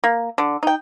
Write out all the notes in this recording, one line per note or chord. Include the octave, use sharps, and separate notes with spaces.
A#3
D3
D#4 G5